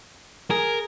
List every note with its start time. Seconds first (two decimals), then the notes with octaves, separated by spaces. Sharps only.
0.50 G#4 A#4